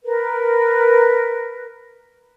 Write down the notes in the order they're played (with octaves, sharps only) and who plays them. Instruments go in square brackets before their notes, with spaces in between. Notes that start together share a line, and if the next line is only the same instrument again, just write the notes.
[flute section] A#4 B4